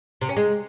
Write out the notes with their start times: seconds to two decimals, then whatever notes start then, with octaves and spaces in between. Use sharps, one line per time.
0.21 C3
0.29 C#4
0.36 G#3